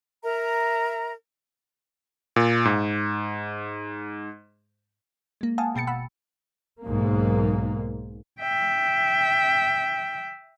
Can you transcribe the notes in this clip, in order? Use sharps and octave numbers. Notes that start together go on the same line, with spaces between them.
A#4 E5 A#5
A#2
G#2
G#3 A#3
F5 F#5 G#5 A5 D#6
G#1 B2 G5 A6 C#7
F#5 B5 E6
B1 G#2 A#3
E5 G5